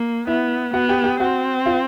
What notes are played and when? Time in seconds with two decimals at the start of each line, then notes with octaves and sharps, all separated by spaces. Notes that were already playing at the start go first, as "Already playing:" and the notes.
Already playing: A#3
0.27 B3 E4 E5
0.73 B3 F#4 F#5
0.89 G4 G5
1.04 G4 G5
1.20 C4 F#4 F#5
1.66 F4 F5